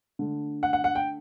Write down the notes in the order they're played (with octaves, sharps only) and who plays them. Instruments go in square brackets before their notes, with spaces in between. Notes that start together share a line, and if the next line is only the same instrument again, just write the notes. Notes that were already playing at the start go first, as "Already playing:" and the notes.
[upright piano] D3 A3
F#5
F#5
F#5
G5